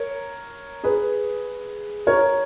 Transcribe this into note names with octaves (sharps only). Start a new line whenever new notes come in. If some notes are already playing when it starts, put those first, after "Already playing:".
Already playing: A#4 C#5
G#4 B4
A#4 C#5